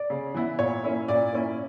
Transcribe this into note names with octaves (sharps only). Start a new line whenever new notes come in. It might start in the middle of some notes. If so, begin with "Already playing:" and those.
Already playing: D5
C#3
E3 B3 E4
A#2 C#5
A#3 C#4 E4
A#2 D5
A#3 C#4 E4